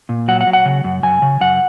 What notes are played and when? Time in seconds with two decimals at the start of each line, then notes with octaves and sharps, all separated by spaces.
0.09 A#2
0.28 F#3 F#5
0.41 F#5
0.47 F#3
0.53 F#5
0.66 C#3
0.84 F#2
1.03 F#2 G#5
1.22 C#3
1.41 F#2 F#5